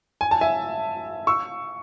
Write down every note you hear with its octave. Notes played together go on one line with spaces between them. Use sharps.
G#5
A5
E5 G#5
C#6 E6